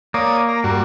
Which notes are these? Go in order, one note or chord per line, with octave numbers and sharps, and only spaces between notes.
A#3 C#5 D5 D#6
A#5
G2 F#4